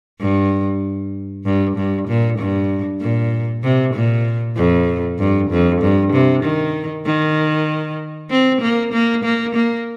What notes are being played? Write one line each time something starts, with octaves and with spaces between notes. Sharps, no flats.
G2
G2
G2
A#2
G2
A#2
C3
A#2
F2
G2
F2
G2
C3
D#3
D#3
C4
A#3
A#3
A#3
A#3